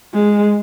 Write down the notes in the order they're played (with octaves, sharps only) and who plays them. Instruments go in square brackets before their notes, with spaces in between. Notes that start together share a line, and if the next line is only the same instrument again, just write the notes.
[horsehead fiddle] G#3